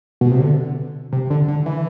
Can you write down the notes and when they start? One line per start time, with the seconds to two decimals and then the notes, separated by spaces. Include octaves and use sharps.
0.21 B2
0.31 C3
0.40 D3
1.13 C3
1.30 D3
1.48 D3
1.66 E3